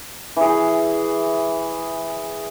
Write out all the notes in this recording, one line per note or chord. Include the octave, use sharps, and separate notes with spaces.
E3 G#4